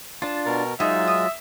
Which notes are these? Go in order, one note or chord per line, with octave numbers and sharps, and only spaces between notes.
D4 F4 A5
B2 A#4
F#3 G#3 D#4 F4 E5
D#6